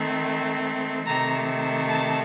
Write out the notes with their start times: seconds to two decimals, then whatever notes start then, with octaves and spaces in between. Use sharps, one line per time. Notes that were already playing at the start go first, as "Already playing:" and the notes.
Already playing: D#3 A3 C4
1.05 C3 D#3 A3 A#5
1.87 A5